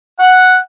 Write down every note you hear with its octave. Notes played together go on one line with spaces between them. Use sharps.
F#5